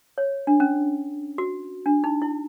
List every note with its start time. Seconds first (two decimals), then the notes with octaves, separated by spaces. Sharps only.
0.18 C#5
0.47 D4
0.60 C#4
1.38 F#4
1.86 D4
2.04 D#4
2.22 E4